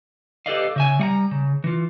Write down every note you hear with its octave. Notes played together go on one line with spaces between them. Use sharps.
G4 A4 B4 D5 D#5 F5
C#3 E5 G#5
G3 F#5 A#5
C#3
E3 F4